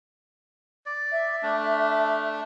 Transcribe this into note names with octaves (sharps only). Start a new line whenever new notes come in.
D5
E5
A3 D4